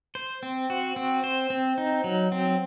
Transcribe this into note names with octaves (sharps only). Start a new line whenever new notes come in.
C5
C4
F#4
C4
C5
C4
D#4
F#3
C4